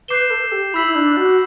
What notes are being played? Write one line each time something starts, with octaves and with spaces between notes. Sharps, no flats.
B4 D6 G6 C7 E7 G7
A4
G4
E4 B5 E6 B6 F#7
E4
D4
F#4